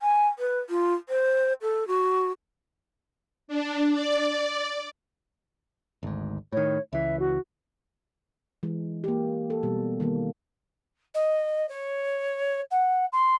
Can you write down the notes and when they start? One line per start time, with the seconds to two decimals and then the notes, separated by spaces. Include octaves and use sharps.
0.02 G#5
0.39 B4
0.70 F4
1.09 C5
1.62 A4
1.88 F#4
3.48 D4
3.91 D5
6.03 G#1 D2 G#2
6.52 A2 D#3 C#5
6.93 C#2 E3 E5
7.19 F#4
8.63 E3 G#3
9.04 A#3 G4
9.50 A4
9.63 B2 G3
10.00 D#3 G3 A#3
11.15 D#5
11.69 C#5
12.71 F#5
13.13 C6